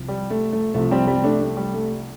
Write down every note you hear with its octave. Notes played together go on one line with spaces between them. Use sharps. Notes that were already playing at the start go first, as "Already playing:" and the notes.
Already playing: C2 C3 F3
G3
A3
A3
C2 C3 F3 A3
G3 C4
G3 C4
A3 D4
A3
G3
A3